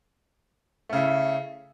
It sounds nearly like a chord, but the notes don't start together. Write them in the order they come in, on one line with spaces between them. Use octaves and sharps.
A3 C#3 E4